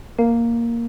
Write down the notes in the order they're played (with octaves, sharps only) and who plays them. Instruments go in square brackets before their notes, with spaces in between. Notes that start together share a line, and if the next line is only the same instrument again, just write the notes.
[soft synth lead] A#3